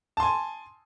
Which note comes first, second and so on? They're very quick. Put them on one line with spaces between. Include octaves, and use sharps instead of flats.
A5 C6 G#5